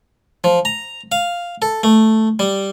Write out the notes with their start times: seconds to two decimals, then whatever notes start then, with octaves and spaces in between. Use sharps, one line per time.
0.44 F3
0.65 A#5
1.12 F5
1.62 A4
1.83 A3
2.39 G3